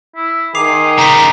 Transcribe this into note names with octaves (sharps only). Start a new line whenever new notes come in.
E4
D#3 G#4 D6 C7 F7
C#3 D#4 A#5 B6